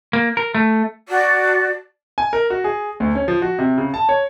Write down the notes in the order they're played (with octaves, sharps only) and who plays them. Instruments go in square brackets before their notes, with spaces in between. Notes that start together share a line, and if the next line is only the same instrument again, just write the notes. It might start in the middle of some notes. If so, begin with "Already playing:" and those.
[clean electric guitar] A#3
A#4
A3
[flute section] F#4 [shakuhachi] D5
[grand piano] G#5
A#4
F#4
G#4
D2
C#4
F3
F#4
C3
C#3
A5
C#5